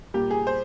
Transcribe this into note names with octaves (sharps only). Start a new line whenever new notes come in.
A#2 G3 A#3 G4
G#4
C5